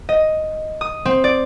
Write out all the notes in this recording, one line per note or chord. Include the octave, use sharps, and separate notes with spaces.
D#5
D#6
C4
D5